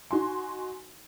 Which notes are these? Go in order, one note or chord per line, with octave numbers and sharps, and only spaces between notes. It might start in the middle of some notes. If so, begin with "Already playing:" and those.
D#4 F#4 G#5 C6